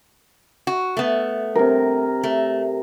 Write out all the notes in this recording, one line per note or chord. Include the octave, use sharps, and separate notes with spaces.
F#4
A3 B3
C3 A#4
A3